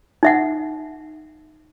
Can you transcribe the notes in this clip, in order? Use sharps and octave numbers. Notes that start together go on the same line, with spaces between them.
D#4 E5 F#5